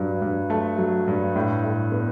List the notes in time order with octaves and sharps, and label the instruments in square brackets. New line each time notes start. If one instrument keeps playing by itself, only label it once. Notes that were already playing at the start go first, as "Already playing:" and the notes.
Already playing: [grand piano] G2 F#3
G2
A3 A5
F#3
G2
A2
A2
B3